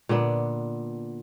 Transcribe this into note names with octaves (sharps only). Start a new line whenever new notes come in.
A#2 D3 B3 D4